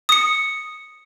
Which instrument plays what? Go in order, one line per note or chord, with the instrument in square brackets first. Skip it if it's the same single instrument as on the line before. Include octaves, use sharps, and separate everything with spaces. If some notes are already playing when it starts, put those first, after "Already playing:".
[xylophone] D#6 C#7